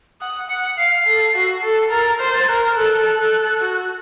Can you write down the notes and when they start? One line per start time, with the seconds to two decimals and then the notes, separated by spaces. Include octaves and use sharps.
0.21 F#5 D#6
0.49 F#5 C#7
0.77 F5 C7
1.06 A4
1.35 F#4
1.63 A4
1.91 A#4 A6
2.20 C5
2.34 A6
2.48 A#4 F#6
2.61 F6
2.75 A4 F#6
3.18 A4
3.61 F#4